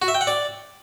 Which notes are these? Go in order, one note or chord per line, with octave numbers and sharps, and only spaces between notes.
F#4
E5
G5
F#5
D5